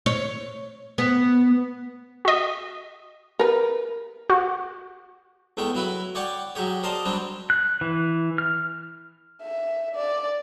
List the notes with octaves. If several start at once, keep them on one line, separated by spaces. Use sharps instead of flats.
C#5
B3
F#4 D#5
A#4 B4
F#4
E2 G#3 A3 G5
F#3 E4 B4
C#5 D5 F#5 G5 D6
F#3 G#3 G4 C#5
A#4 C5 D5 D#5 A5
F#3 G3 C4 D4
F#6
E3
F6
E5
D5